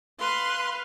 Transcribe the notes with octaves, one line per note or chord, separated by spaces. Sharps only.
B4 F5 C6